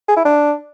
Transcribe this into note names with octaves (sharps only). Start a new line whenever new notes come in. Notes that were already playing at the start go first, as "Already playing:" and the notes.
G#4
E4
D4